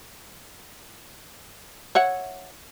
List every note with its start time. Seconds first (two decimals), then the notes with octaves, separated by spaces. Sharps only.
1.95 C#5 E5 F#5